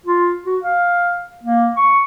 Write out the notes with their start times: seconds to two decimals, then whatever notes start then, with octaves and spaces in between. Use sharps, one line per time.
0.06 F4
0.45 F#4
0.63 F5
1.43 A#3
1.77 C#6